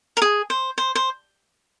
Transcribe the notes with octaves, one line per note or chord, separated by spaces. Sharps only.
A#4
G#4
C5
C5
C5